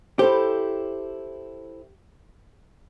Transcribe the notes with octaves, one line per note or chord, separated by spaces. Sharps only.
E4 G4 A4 C5